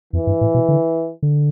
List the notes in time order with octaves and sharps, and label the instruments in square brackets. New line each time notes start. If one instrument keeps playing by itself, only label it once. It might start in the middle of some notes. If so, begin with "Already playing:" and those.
[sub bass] F2 [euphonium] E3
[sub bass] G2
A2
B2
D3
D3